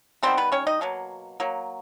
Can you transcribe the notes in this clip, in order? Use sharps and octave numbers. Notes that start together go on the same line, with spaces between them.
D#3 G3 B3 C4 C5
B3 B4
C#4 C#5
D#4 D#5
B2 F#3 A#3
F#3 A#3